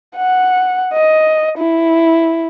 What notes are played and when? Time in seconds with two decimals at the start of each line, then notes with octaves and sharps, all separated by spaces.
0.16 F#5
0.94 D#5
1.58 E4